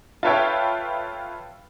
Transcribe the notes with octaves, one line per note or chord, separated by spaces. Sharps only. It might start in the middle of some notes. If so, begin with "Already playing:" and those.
F4 A4 B4 C#5 E5 G5